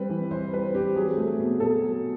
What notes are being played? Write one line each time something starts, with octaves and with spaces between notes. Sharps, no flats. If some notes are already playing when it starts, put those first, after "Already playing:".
Already playing: G3 C4 B4
E3
E3 C5
G3 B4
C4 G4
F#3 G#4
A3
B2
B2 A4
F#3